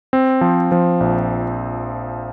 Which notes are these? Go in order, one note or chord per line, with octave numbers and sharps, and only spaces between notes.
C4
F3
F3
A#1